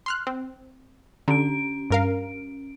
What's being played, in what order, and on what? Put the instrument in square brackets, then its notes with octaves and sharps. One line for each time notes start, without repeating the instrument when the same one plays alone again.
[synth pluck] C6 F6 F#6
C4
[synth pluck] D3 [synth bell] C#4 D7
[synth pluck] G2 A#4 F5